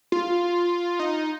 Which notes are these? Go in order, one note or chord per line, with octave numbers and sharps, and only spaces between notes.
F4
D#4